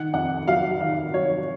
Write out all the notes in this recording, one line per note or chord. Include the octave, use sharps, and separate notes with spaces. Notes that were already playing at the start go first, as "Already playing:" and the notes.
Already playing: D#3 F#5
F2 F#5
F#3 F5
D#3 F5
F#3 C#5